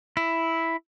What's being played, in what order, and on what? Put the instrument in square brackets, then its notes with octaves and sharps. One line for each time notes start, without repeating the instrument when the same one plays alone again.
[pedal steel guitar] E4